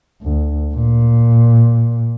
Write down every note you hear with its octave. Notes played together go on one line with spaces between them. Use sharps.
D2
A#2